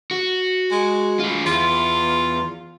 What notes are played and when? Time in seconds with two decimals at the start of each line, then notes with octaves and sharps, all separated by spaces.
0.11 F#4
0.71 G#3
1.19 F4 G#4
1.46 E2 F4